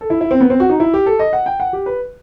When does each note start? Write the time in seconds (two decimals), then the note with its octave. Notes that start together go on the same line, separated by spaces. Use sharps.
0.01 A4
0.10 E4
0.21 E4
0.31 C4
0.41 B3
0.50 C4
0.60 F#4
0.70 D#4
0.80 E4
0.94 G4
1.06 A4
1.19 D#5
1.33 F#5
1.46 G5
1.60 F#5
1.73 G4
1.86 B4